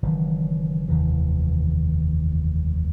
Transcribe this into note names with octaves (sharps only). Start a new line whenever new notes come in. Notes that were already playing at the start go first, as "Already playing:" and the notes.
F#1 D#3 E3
F1 D#2 D#3 E3